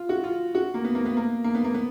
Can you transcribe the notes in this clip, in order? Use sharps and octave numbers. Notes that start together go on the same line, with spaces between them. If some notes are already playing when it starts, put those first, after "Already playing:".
Already playing: F4
F#4
F4
F#4
A#3
B3
A#3
B3
A#3
A#3
B3
A#3
B3